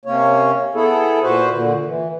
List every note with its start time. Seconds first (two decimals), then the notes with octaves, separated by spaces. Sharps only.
0.05 C3 A#3 C#4 C#5
0.75 B3 E4 G#4 A4
1.23 A#2 F#4 B4 C5
1.52 A#2 D3
1.86 E3